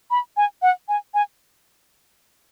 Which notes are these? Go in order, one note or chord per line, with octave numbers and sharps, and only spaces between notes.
B5
G#5
F#5
G#5
G#5